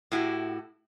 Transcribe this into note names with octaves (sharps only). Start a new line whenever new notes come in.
A2 E4 F#4 G4